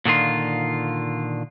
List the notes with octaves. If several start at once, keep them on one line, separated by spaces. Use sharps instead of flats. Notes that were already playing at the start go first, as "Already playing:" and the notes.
A#2 D3 D#3 F4